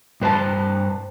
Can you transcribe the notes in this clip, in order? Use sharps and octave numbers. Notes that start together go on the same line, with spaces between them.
G2 B4 C5 A5